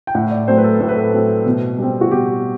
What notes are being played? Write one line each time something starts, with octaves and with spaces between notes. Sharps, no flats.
G5
A2 F#5
D5
F#3 A3 C4 C5
B4
A4
A2 A4
B4
A4
F#3 A3 C4
B2
G3 C4
F#4
B2 G4